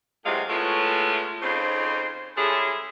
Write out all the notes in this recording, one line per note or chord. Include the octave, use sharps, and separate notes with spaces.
A2 C3 E3 F#3 G#3 F5
G#3 A3 B3 C#4 E4 F4
F2 C#3 D#4 B4 C5
G3 G#3 C#4 E4 G#4 A4